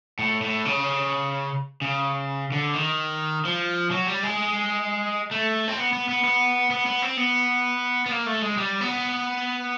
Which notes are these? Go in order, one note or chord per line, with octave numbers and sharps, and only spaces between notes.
A2
A2
C#3
C#3
D3
D#3
F3
F#3
G3
G#3
A3
C4
B3
B3
B3
B3
B3
B3
C4
B3
B3
A#3
A3
G#3
G3
B3